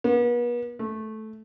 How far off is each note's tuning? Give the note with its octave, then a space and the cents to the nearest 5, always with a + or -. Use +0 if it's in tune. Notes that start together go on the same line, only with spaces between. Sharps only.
B3 -40
A3 -10